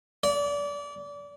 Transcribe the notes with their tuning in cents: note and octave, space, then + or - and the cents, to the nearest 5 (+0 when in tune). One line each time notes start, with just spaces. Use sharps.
D5 -30